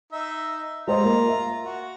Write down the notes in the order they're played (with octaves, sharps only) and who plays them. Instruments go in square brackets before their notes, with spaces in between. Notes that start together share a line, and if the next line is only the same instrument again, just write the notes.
[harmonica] D#4 E5
[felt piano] G#3 C5 D#5 [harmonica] F4 A#5
[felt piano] A#3
E5
[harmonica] F#4